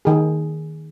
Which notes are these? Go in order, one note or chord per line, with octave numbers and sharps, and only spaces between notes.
D#3 G#4